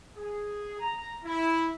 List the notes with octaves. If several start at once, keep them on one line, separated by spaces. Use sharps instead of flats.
G#4
A#5
E4